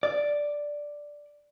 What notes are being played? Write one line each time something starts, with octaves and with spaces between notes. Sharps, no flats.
D5